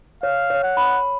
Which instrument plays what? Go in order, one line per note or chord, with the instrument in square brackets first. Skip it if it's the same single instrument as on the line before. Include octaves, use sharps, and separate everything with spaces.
[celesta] C#5 [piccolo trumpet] F5
[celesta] C#5
[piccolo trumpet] F#5
[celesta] B5